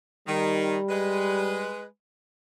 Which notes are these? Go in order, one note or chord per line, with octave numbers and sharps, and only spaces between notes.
D#3 G3
G#3 B4